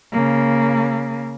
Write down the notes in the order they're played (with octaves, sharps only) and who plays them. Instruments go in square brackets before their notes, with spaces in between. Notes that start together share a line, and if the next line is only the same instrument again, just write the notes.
[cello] C#3 A#3